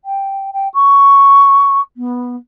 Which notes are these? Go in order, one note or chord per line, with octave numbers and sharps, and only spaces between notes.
G5
G5
C#6
B3